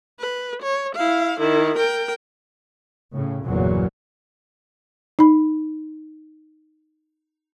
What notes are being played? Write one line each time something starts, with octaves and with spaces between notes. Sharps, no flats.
B4
C#5
E4 F5
D#3 E4
A#4 G5
A2 C#3
G1 E2 A#2 C#3 E3 F#3
D#4 B5